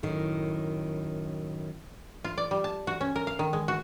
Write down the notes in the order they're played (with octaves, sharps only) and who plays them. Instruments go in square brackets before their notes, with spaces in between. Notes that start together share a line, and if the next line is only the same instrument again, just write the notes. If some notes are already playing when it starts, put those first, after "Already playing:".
[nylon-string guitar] F#2 A2 D#3
[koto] F4
D5
G3
A5
F#4
C#4
A#4
F5
D#3
G#3
F#4